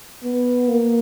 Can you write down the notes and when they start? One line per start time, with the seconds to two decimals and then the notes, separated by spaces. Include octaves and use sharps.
0.24 B3
0.68 A#3